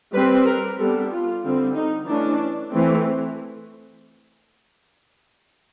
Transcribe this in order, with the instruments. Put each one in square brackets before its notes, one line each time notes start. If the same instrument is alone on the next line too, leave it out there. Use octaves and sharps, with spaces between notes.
[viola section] G3 C4 B4
A#4
G3 B3 D4 A4
F4
D3 G3 C4
D#4
E3 A3 C#4 D4
E3 A3 C4